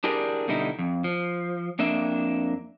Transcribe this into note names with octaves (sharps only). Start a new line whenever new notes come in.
D4 E4 G4 G#4 A#4 D5
B2 D3 G3 D#4 E4
F2
F3
F2 A#3 D4 E5